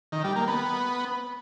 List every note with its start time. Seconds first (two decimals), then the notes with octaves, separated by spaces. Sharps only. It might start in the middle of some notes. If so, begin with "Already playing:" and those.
0.12 D#3
0.24 G3
0.36 A#3
0.48 B3